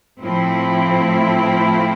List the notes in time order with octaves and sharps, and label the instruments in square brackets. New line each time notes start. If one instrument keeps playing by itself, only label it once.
[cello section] A2 F3 A3 C4 E4